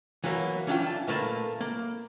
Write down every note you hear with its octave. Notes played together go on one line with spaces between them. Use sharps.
E3 F#3 A#3 B3
E3 C#4 D4 F4 G5
A5
A#2 A3 A#3 B4 C5 A5
A#3